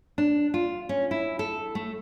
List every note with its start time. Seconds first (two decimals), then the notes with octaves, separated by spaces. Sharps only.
0.18 D4
0.54 F4
0.89 C#4
1.11 E4
1.39 A4
1.75 A3